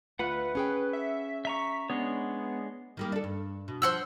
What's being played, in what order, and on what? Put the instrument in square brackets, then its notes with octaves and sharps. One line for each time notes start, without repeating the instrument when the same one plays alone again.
[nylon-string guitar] D2 A3 F4 [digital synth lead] B4 [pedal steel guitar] F#5 B5
[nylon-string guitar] C#4 G#4 G5
[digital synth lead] E5
[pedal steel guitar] E5 A#5 C#6 [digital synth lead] B6
[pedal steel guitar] G#3 D4 C#5 [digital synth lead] B3
[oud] D#3 G3 A#3
D4 A4
G2
B2
[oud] F3 [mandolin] C5 F#5 E6